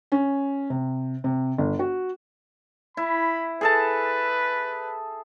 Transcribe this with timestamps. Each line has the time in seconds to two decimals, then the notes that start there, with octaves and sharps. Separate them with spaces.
0.12 C#4
0.70 C3
1.24 C3
1.58 G1
1.79 F#4
2.97 E4 B5
3.61 G#4 A4 B4 A5